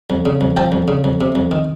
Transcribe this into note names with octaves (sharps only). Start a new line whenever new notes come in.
F2
C#3
F2
F3 G5 A5
F2
C#3
F2
C3
F2
D#3